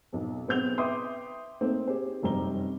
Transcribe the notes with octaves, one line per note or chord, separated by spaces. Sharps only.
B1 F2
B1 B3 C4 G#4 G6 F7
B4 E5 G5 C6 D6 D#6
A3 A#3 C4 D#4
G4 G#4 C5
F1 F#2 G3 C4 A#5 G7